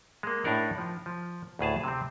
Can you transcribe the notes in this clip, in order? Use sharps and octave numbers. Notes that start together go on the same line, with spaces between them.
G#3 A#3
A2 D4 D#4 A#4 F#5
F3
F3
D2 A2 G#4 A5
C3 C4